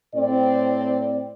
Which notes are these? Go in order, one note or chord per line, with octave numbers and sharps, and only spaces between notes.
A2 C4 D5